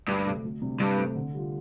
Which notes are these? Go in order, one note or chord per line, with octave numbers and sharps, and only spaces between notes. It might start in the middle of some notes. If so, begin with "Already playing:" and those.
D2 G2
C3 A3 C4
D2
C3 G3 D4
G2 C3
A3 C4
D3
G3 F4